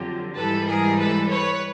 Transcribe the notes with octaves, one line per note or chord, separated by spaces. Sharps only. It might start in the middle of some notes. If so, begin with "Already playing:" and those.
Already playing: F2 D3 F#3 F4 G4
G#2 E3 G3 A4 B4
G#4 A#4
A4 B4
B4 C#5